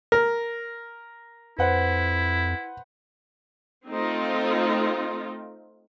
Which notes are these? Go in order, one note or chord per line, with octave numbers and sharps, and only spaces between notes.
A#4
F2 E4 B4 C5 F#5
A3 C4 D#4 F4